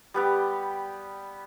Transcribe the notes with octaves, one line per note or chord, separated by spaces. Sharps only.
G3 B3 G4